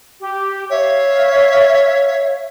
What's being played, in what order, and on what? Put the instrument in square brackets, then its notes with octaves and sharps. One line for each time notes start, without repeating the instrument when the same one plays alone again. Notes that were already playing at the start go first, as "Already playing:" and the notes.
[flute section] G4
[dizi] C#5 [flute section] E5 F5